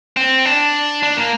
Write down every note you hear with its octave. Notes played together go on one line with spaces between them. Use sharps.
C4
D4
D4
A#3